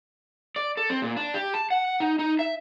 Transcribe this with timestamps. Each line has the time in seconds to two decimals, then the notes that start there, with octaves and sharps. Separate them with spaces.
0.56 D5
0.77 A4
0.90 C4
1.02 A#2
1.17 D4
1.34 G4
1.54 A5
1.71 F#5
2.00 D#4
2.19 D#4
2.39 E5